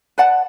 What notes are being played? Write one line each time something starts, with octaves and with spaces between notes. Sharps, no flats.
B4 D5 F#5 A5